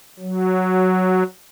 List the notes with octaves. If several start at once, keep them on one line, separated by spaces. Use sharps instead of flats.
F#3